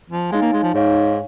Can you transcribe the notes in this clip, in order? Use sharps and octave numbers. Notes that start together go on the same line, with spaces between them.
F3
G#3 D#4 C#5 F5 G#5
A#3
G#3
F3
G#2 D#4 C#5 F5 G#5